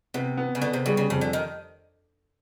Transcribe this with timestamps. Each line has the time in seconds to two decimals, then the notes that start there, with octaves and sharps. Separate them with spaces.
0.14 C3 B3
0.37 B3
0.55 C#3
0.61 D3 B3
0.73 C3
0.86 C#3 G3
0.97 C#3
1.10 F2 C#3
1.21 D3
1.33 D#3